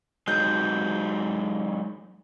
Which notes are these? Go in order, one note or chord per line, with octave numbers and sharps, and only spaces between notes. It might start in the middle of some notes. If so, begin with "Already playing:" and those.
F#3 G#3 D#4 G6